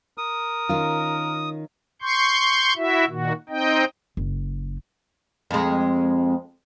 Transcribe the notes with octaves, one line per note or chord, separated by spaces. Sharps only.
A#4 D#6
D#3 C#4 F4
C6 C#6 G6
E4 F#4 E5
A#2 D#3 F#4
C4 D#4 D#5 G5
F#1
F2 G#3